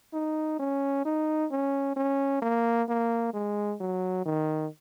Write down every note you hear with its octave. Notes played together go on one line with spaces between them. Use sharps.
D#4
C#4
D#4
C#4
C#4
A#3
A#3
G#3
F#3
D#3